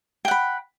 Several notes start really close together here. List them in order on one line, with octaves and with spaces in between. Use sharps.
G5 F#5 B5